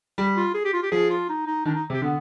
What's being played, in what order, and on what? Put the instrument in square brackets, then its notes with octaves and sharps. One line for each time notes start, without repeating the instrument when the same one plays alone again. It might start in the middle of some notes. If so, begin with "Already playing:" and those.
[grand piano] G3
[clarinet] F4
G#4
G4
F4
G4
[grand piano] F3 [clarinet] G#4
[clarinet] F4
D#4
D#4
[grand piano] D#3 [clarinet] D4
[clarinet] D#4
[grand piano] C3
[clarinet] G4
[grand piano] D3 [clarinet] B3